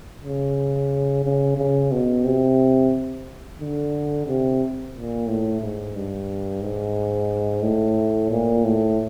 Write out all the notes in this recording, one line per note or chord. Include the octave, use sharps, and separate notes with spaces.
C#3
C#3
C#3
B2
C3
D3
C3
A#2
A2
G#2
G2
G#2
A2
A#2
A2